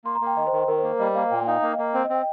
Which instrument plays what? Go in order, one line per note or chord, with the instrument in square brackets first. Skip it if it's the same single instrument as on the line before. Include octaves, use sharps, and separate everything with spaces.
[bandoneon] A#3 [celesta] C6
[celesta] A#5
[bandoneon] A#3
[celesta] G5
[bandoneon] D#3 [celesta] D#5
[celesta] C5
[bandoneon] D#3
[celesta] C5
[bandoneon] D#3 [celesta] A#4
[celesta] C5
[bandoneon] A#3
[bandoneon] G3 [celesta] D#5
[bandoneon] A#3 [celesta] F5
[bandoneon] A#2 [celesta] G5
[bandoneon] D#4 [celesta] F5
[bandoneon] A#3 [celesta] D#5
[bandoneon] A#3 [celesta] D#5
[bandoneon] C4
[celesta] D#5
[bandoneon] C4
[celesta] G5